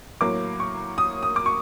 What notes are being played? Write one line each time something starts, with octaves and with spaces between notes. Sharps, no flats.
A2 F#3 A#3 D6
C#6
D#6
D#6
D6
C#6